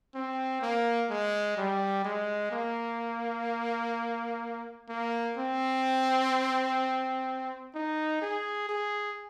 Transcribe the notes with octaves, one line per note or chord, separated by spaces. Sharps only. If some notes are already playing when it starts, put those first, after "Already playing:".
C4
A#3
G#3
G3
G#3
A#3
A#3
C4
D#4
G#4
G#4